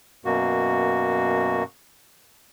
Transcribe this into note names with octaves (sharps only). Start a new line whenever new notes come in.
F#2 B2 A#3 F#4